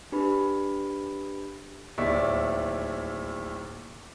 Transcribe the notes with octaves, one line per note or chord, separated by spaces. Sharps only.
D4 G4 B4 B5
D1 D#2 D5 E5 C#6